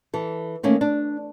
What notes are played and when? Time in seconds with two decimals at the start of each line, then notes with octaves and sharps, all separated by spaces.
0.14 E3 A4
0.63 D#3 A3 A#3 C#4
0.81 D4